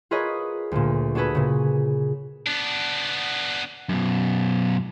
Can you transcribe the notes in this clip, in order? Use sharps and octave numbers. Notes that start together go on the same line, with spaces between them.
F4 G#4 A#4 B4 C#5 D#5
D2 A#2
D4 F#4 G#4 A4 B4
A#2 C#3
B3 D4
F#2 B2